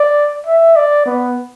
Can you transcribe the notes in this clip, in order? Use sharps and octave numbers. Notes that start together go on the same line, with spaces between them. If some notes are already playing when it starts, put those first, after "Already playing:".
Already playing: D5
E5
D5
B3